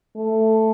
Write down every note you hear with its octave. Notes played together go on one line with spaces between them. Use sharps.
A3